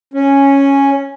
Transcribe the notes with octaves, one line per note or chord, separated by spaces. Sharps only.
C#4